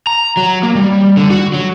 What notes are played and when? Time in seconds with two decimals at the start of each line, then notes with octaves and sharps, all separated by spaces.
0.07 A#5
0.37 F#3
0.63 A#3
0.76 G3
1.17 D3
1.31 F#4
1.54 F#3